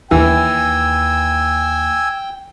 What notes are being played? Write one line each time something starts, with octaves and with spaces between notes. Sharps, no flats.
D#2 E3 G5 G#5 E6